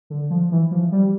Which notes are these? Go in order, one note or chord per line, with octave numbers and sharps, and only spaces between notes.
D3
F3
E3
F3
G3